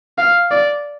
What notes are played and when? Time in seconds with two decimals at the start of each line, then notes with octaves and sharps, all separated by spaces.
0.18 F5
0.51 D5